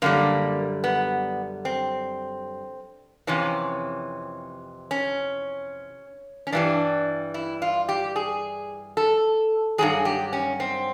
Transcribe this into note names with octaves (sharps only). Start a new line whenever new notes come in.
F#2 D3 G3 A#3
B3
C4
F2 C3 E3 C#4
C#4
C#4
G2 E3 G3 D4
E4
F4
G4
G#4
A4
G2 D#3 F#3 G#4
G4
C#4
C4